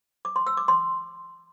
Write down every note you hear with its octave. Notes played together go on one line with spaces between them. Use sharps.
D6
C6
E6
D6
C6